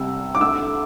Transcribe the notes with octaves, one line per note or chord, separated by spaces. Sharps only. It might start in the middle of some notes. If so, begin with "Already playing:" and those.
Already playing: C2 C3 G3 E6
D6
D2 D3 A3 E6